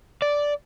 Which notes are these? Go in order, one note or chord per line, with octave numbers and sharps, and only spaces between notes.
D5